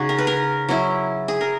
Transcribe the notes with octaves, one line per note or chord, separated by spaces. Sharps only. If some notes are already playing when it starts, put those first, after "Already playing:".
Already playing: C#3 D#4 F#4 G#4 D#5
A#4
B4
A#4
F#3 C#4 E4
G#4
A#4